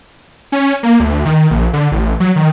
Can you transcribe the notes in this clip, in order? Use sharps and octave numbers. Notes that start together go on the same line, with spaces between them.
C#4
A#3
D2
D#3
A#1
D3
A1
F#3
D#3